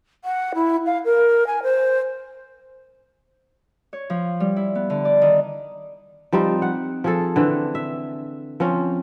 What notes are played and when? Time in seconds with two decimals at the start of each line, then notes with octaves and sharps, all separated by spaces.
0.24 F#5
0.55 E4
0.86 F5
1.05 A#4
1.47 G#5
1.63 C5
3.93 C#5
4.10 F3
4.40 G3
4.56 E4
4.75 B3
4.90 D3
5.05 D5
5.22 D#3
6.33 F3 G3 C4 D#4
6.62 F#5
7.04 F3 G#4 A4
7.36 D3 E3 C4
7.75 E5
8.60 F3 C4 C#4